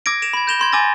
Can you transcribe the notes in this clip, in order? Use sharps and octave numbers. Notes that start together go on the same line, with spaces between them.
D6 E6 G#6 A#6 D7
A#6 D7 E7 F7
B5 G#6
G6 A#6 E7 F7 G7
B5 C6 G#6
G#5 D6 E6 A6 A#6